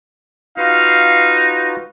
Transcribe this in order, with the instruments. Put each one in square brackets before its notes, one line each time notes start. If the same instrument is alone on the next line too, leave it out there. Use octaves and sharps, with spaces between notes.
[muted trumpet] D#4 [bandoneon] F4 F#4 B4 [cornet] F5